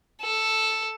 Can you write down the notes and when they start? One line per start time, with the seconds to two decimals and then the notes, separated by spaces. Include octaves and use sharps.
0.22 A4